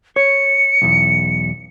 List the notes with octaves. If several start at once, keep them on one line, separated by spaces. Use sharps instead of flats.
C#5 C#7
B1 E2